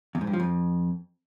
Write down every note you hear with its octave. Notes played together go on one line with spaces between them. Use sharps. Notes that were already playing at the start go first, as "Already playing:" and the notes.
E2
G#2
G2
F3
F2